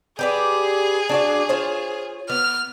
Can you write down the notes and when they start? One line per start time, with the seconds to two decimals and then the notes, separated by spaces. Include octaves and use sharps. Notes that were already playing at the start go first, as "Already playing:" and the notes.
0.19 G4 G#4 B4 D5
1.09 D4 F#4 D5
1.49 F4 C5 C#5
2.30 B3 F6